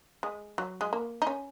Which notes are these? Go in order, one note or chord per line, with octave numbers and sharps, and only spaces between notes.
G#3
F#3
G#3
A#3
D#4
C#4